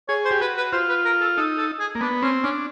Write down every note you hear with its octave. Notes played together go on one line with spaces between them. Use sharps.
G#4 C#5
C5
G4
F#4 B4
B4
F4 C5
B4
A#4
A4
D#4 A4
A4
G#4
A#3
B3 D4
C4 C#4
C#4 D4